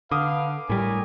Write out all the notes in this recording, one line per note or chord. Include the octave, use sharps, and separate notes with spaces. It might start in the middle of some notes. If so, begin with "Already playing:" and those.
D3 B4 F5 D6 D#6
A2 G3 A#4 C#5 G#5